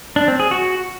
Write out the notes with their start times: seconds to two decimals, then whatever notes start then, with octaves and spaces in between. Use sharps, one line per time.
0.16 D4
0.28 C4
0.40 G#4
0.51 F#4